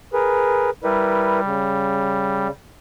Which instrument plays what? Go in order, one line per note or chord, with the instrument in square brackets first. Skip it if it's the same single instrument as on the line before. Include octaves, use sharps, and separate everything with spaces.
[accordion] G#4 A#4 B4
[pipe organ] G3 [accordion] E4 A#4 B4
[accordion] C#3